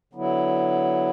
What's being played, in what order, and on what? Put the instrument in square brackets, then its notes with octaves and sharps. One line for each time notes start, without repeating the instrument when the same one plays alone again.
[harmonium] D3 F#3 B3 E4